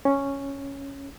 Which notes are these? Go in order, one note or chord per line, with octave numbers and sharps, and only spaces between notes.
C#4